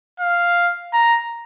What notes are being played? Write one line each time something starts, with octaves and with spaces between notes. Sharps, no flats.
F5
A#5